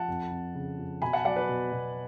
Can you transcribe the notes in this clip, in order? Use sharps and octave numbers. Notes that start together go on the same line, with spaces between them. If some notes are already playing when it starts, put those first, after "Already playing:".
Already playing: F3 F#5 A5
F2
F2
C#3
F2
B2 G#5 B5
F#5 A5
F#3 D5 F#5
B4 D5
B2
B2